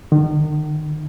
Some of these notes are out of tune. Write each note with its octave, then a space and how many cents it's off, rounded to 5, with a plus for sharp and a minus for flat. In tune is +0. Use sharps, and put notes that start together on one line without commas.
D#3 -40